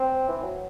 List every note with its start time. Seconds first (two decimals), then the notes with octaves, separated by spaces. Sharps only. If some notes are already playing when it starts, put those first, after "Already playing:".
Already playing: C4
0.29 E3
0.43 F#3